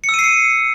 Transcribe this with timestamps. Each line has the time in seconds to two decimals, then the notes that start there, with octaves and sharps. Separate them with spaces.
0.04 C#7
0.09 E6
0.14 D#7
0.19 C7
0.24 C#7